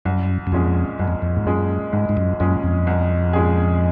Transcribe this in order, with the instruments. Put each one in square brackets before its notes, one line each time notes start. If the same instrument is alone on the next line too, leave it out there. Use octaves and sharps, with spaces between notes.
[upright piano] C2 [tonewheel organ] F#2
[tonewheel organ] F#2
[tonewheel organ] F2 [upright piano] A#2 G#3 C#4 G#4
[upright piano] C2 [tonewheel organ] F#2
[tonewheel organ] F2
F2
G#2
[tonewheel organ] F#2 [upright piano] A#2 G#3 C#4 G#4
[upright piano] C2 [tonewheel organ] G#2
[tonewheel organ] G#2
F#2
[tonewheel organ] F#2 [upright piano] A#2 G#3 C#4 G#4
[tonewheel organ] F2
[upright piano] C2
A#2 G#3 C#4 G#4